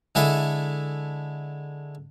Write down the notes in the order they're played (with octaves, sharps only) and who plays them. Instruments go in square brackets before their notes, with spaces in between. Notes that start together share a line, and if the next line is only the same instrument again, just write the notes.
[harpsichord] D3 G#3 E4 A4 E5 D#6